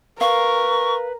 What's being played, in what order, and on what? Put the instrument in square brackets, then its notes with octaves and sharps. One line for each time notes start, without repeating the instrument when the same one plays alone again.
[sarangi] A#4 [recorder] B4 [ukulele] F5 [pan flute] C#6